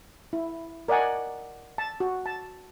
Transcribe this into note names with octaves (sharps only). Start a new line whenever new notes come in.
E4
A#4 D5 D#5 F#5 G#5
A5
F#4
A5